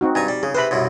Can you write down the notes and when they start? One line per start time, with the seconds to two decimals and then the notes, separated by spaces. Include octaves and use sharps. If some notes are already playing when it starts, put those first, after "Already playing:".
0.01 C4 D#4 F#4
0.15 G2 G#5 A#5
0.28 G3
0.43 C#3 G#4
0.55 C3 B4 C5 B5
0.71 C2 F#2 B2